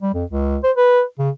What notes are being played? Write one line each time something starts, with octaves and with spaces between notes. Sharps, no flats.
G3
F2
C#2
C5
B4
C#3